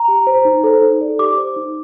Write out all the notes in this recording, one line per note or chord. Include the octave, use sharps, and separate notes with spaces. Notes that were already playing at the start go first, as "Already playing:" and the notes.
Already playing: A#5
G4
C5
D#4
A4 C5
D#4
A4 D5
G4 D6
C5
D#4